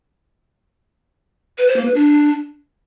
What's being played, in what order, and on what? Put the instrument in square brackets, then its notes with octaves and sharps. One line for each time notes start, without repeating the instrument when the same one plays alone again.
[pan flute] B4
C5
A#3
B4
D4